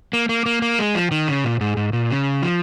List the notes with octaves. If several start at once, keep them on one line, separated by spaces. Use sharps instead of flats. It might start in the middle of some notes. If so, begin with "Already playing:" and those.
A#3
A#3
A#3
A#3
G#3
F3
D#3
C#3
A#2
G#2
G#2
A#2
C#3
F3